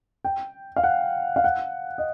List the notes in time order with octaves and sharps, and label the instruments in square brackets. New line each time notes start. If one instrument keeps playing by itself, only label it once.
[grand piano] G5
F5
F#5
F5
F#5
D#5